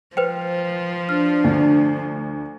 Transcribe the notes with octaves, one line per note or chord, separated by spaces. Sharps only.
F3 B4 C5 G5
D4 F6
D2